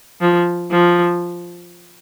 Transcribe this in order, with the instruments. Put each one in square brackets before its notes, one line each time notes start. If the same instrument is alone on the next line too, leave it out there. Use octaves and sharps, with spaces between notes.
[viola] F3
F3